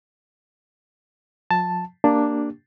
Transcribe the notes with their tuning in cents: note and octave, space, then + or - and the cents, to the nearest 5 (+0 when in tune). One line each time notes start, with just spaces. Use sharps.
F3 +45 A5 +0
A#3 -5 D4 +0 G4 +0